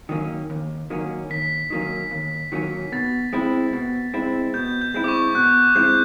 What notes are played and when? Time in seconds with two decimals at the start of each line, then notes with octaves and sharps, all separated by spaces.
0.09 D#3 F#3 A#3 C#4
0.50 D#2
0.90 D#3 F#3 A#3 C#4
1.30 D#2 B6
1.70 D#3 F#3 A#3 C#4
2.11 D#2
2.52 D#3 F#3 A#3 C#4
2.92 B2 A6
3.33 G#3 C4 E4
3.73 B2
4.14 G#3 C4 E4
4.54 B2 G6
4.82 G6
4.94 G#3 C4 E4
5.04 D6
5.08 C#6
5.35 B2 F#6
5.76 G#3 C4 E4 G6